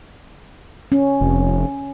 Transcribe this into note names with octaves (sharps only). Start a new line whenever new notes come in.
C#4
F1